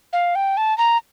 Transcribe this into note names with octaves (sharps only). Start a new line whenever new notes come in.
F5
G5
A5
A#5